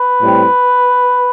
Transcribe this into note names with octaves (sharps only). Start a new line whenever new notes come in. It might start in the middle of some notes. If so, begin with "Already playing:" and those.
Already playing: B4
A2 G3 C4